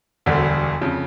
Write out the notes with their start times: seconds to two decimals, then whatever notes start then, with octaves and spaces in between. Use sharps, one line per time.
0.26 E1 D2 D3 G3
0.82 F2 C#3